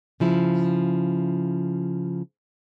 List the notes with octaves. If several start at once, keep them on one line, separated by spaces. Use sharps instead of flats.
C#3 F3 E4